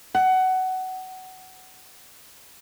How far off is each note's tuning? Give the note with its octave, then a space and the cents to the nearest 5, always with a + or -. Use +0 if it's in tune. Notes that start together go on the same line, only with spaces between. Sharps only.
F#5 +20